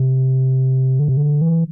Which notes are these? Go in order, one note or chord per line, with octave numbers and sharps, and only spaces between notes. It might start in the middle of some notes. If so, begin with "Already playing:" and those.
Already playing: C3
D3
C3
D3
E3